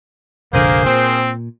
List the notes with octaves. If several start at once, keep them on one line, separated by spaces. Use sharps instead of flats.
F1 A#1 D3 A#3 G#4 A#4 C5
A#2 C4